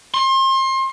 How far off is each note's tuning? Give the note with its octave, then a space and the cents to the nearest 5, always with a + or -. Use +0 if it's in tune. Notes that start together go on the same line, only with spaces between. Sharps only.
C6 +30